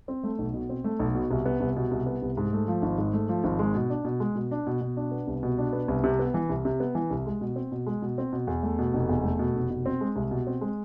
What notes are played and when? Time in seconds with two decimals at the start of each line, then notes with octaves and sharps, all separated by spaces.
0.08 C4
0.24 A3
0.39 B1
0.54 B2
0.69 C4
0.84 A3
0.99 B1
1.15 B2
1.31 C2
1.46 B3
1.60 C2
1.77 B2
1.91 C2
2.06 B3
2.22 C2
2.37 G#2
2.53 A3
2.68 F3
2.82 G#1
2.98 G#2
3.13 A3
3.29 F3
3.44 G#1
3.59 G#3
3.75 B2
3.90 D4
4.05 B2
4.20 G#3
4.35 B2
4.51 D4
4.67 B2
4.81 B2
4.97 D4
5.11 B3
5.27 C2
5.43 B2
5.58 D4
5.73 B3
5.88 C2
6.04 C3
6.19 B3
6.34 E3
6.49 C2
6.65 C3
6.80 B3
6.95 E3
7.11 C2
7.26 G#3
7.41 B2
7.56 C4
7.72 B2
7.87 G#3
8.02 B2
8.18 C4
8.33 B2
8.47 E2
8.63 A3
8.79 B2
8.93 F1
9.09 E2
9.24 A3
9.39 B2
9.55 F1
9.71 B2
9.86 C4
10.01 G#3
10.16 C2
10.31 B2
10.47 C4
10.61 G#3